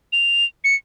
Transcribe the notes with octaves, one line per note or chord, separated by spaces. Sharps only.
F7
C#7